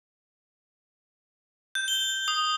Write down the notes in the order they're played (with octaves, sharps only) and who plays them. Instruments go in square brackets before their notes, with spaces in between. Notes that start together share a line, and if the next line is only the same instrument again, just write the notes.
[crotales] G6
G7
D#6